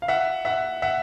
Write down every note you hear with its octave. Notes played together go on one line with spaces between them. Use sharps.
F5
E5 F#5
E5 F#5
E5 F#5